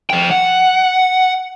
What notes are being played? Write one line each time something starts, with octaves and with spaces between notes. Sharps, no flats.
F3 G5
F#5